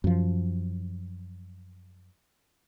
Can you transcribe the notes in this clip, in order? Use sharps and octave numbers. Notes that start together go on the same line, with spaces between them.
F#2 F3